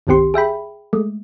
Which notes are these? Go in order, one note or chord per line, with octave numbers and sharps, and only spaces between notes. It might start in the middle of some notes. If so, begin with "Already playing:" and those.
G1 C2 D#3 C4 G4 C6
G#4 E5 G5 B5
G#3 A3